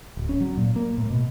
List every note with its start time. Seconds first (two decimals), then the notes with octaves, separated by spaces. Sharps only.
0.17 D1
0.29 C#4
0.40 F#3
0.57 A#2
0.76 A#3
0.97 A2
1.10 B2